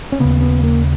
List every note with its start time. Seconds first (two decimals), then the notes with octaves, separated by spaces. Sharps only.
0.12 C#4
0.20 D#2 C#3 B3
0.41 B3
0.63 A#3